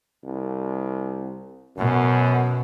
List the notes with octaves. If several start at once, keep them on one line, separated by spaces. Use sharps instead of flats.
C2
F#2 B2